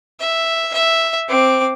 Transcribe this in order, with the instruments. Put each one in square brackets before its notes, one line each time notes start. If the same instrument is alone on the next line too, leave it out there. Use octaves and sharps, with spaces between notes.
[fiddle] E5
E5
C4 D6